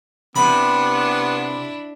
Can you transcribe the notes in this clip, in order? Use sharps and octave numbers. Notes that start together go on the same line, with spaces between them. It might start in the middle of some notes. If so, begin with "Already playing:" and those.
C3 B3 D4 E4 B5